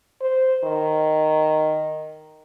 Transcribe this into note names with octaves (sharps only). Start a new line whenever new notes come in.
C5
D#3